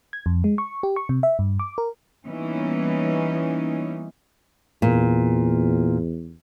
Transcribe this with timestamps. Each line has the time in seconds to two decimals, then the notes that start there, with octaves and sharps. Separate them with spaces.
0.13 G#6
0.26 F2
0.44 G#3
0.58 C#6
0.83 G4
0.96 C#6
1.09 C3
1.23 E5
1.39 G2
1.59 D6
1.78 A#4
2.28 E3 G3 A#3 B3 C#4 D#4
4.82 E2 A#2